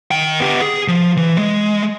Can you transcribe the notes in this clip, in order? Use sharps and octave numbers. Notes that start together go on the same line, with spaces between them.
D#3 G5
B3 G4
G#4
F3
E3
G#3